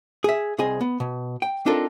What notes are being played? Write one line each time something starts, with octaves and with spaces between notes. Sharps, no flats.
G#4 E5
C2 C4 G#4 D#5 G#5
B3
B2
G5
C4 D4 D#4 F4 A4 A#4